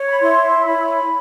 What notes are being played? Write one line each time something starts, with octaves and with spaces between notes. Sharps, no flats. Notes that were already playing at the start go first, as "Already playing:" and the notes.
Already playing: C#5
B5
E4 C6
C#5 B5